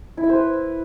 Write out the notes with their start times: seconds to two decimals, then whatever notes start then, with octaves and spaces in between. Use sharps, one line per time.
0.17 E4
0.23 E5
0.29 C5
0.35 B4